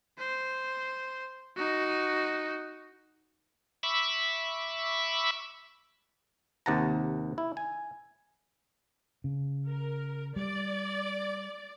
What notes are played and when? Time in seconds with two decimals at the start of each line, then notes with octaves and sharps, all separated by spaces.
0.19 C5
1.57 D#4 F#4
3.83 E5 B5 C#6 D6 E6
6.66 D#2 C3 F#5 A5 A#5
7.38 E4
7.57 G#5
9.24 C#3
9.68 A#4
10.36 G3 D5